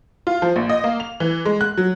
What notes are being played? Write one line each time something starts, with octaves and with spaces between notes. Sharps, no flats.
F4
F3
A#1
D#5
A#3
F7
E3
G#3
F#6
F#3